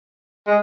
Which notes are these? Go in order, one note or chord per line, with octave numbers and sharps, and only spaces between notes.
G#3